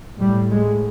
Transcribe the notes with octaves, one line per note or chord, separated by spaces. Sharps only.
A2 G3
G#3